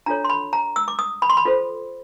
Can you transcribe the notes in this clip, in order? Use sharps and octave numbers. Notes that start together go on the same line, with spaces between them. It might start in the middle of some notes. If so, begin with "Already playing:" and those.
D4 F4 A4 C#5 A#5
C6
B5
A#5
E6
D6
D#6
B5
C6
B5
F4 A4 C5